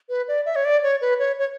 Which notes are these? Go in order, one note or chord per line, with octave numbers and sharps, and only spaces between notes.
B4
D5
E5
C#5
D5
C#5
B4
C#5
C#5